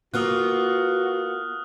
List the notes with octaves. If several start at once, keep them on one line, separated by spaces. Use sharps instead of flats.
A#3 B3 F4 F#4 D#6 F6 F#6